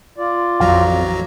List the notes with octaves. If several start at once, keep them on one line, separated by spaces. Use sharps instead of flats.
F4 D5
A1 F2 F#3 F5 A#5